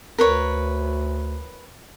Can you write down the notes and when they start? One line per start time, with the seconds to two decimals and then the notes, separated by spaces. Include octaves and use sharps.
0.18 D2 A#4 B4 C#5